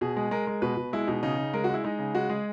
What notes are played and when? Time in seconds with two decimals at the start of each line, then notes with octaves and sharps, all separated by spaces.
0.01 B2 G#4
0.17 G#3
0.31 G#3 A#4
0.47 G#3
0.62 B2 B4
0.77 B2
0.93 G#3 E4
1.07 B2 D#4
1.23 C#3 D#4
1.38 C#3
1.53 G#3 A#4
1.64 F#4
1.69 G#3 E4
1.84 G#3 D#4
1.99 C#3
2.15 G#3 F#4
2.29 G#3 G#4